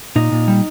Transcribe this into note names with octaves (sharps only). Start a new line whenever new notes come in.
A#2 D#4
A#2
G3